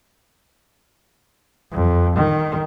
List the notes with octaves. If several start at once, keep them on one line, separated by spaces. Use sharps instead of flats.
F2
D#3